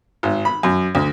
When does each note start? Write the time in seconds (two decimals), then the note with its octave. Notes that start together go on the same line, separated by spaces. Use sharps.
0.23 G#1
0.45 B5
0.63 F#2
0.95 D2